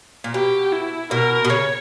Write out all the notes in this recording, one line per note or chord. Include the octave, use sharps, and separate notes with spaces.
A#2
B2 G4
E4
B2 A#4
B2
C#3 C#5